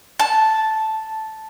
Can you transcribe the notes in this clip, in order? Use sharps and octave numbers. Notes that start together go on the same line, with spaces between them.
A5